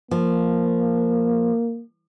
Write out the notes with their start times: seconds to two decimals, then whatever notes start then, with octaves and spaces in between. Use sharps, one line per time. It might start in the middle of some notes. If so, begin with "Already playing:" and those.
0.11 F3 A#3